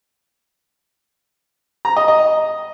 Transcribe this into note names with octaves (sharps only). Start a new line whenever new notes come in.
A#5
D#5
D#5